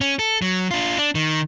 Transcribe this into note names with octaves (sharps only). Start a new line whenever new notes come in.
C#4
A4
F#3
D4 F4
D4
D#3